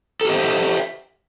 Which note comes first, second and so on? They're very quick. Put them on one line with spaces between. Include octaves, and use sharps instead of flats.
A4 G4 D#5 C5 E5